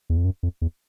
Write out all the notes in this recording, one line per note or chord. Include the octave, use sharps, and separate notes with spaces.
E2
F2
F#2
F2
E2